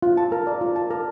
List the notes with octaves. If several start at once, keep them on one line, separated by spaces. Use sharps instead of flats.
F4
A5
A#4
D5
F4
A5
A#4